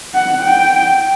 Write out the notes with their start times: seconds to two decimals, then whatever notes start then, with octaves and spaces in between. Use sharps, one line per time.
0.15 F#5
0.43 G5